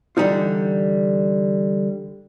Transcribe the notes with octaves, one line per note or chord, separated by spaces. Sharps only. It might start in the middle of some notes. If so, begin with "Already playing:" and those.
D3 E3 G3 C#4 D#4 F4